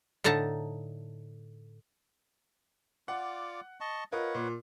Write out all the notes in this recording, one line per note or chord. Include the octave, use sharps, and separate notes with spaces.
A2 D3 D#4 A5 A#5
F4 D5 F#5 D6
D#5 A5 C#6
F4 A#4 B4 C#5 D#5 F#5
A#2